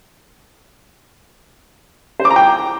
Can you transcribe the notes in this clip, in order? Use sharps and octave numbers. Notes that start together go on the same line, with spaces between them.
C5
D6
A#5
G5